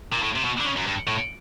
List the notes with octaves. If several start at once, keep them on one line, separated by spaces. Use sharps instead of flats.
A#2
A2
C3
B2
D3
C#3
F#2
G2
A2